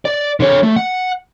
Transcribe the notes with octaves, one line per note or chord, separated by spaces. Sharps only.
D5
D3 C#5
A3
F#5